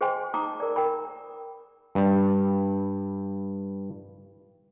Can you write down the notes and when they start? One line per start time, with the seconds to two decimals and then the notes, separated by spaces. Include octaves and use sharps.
0.01 G#4 C5 D#5 G5 G#5 C6
0.34 D#4 A#5 D6 D#6
0.60 A#4 D5
0.76 A#4 G5 B5
1.95 G2 G3